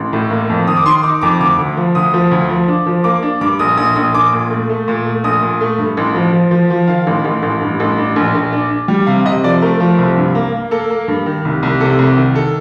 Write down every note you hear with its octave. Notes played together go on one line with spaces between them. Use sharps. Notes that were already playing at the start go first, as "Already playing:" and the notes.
Already playing: A1
A2
A#3
F2
D#3 D#6
D6
D#3 C6
D#4 D6
F2 D6
D2 D6
D2
F3
D2 D#6
F3
D2
F3
D4
F3
A#3 D6
D4
G2 D6
A#1 D#6
A#1 D#6
A#1 D#6
A#1 D6
A#2
A3
A3
A#2
A3
A#1 D#6
A#2
A3
G2
A1
F3
F3
F3
F3
D#3 F5
A1
A1
A1
G2
A1
D4
A#1
A#1
D4
D4
G3
C3 F5
C3 D#5
F3 D5
A3 A#4
F3
C2
G2
A#3
A#3
A#3 A4
A#3
G2
D#3
C2
C2
C3 A4
C2
D#3
A4